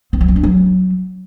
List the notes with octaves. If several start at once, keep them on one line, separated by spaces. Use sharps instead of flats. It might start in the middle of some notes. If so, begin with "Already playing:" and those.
C4
F#3
C4
D4
F#3